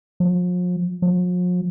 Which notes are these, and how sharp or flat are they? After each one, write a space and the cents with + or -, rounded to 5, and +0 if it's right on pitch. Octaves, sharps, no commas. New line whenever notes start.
F3 +40
F3 +45